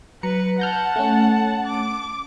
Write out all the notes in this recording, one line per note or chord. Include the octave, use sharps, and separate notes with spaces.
F#3 B4 A#5 C#7
F#5 A5 F6 G6 A#6
A3 C#4
D6